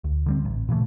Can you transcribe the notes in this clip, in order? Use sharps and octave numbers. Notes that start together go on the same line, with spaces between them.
D2
D3 G3 C4
A1
A#2 C#3 E3 A3